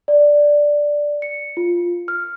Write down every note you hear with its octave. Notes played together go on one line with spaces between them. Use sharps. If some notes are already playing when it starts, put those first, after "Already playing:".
D5
C#7
F4
F6